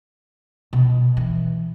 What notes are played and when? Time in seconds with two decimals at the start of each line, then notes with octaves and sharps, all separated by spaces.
0.73 B2
1.17 E3